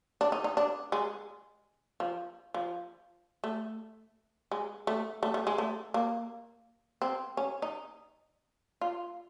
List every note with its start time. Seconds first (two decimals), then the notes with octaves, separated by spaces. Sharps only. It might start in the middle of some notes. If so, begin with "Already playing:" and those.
0.21 D4
0.32 D#4
0.44 D#4
0.57 D4
0.92 G#3
2.00 F3
2.54 F3
3.44 A3
4.51 G#3
4.87 A3
5.23 A3
5.34 A3
5.47 G#3
5.58 A3
5.94 A#3
7.02 C4
7.37 C#4
7.62 D#4
8.81 F4